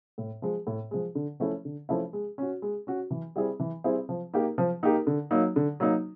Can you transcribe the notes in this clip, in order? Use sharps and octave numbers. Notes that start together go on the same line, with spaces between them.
A2
F3 G#3
A2
F3 G#3
D3
F3 A3 C#4 E4
D3
F3 A3 C#4 E4
G#3
C#4 F#4
G#3
C#4 F#4
E3
G3 C4 E4 G#4
E3
G3 C4 E4 G#4
F3
A#3 D#4 G4 A#4
F3
A#3 D#4 G4 A#4
D3
F#3 A#3 D#4
D3
F#3 A#3 D#4